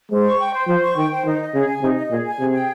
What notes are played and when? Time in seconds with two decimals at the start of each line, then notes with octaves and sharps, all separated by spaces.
0.10 G#3 C5
0.25 C#6
0.39 G5
0.54 C5
0.67 F3 C5
0.82 C#6
0.96 D#3 G5
1.11 C5
1.25 D#3 D#4
1.40 D#5
1.54 C#3 G#4
1.68 G#5
1.82 C3 D#4
1.96 D#5
2.11 A#2 G#4
2.26 G#5
2.39 C3 G#4
2.54 G5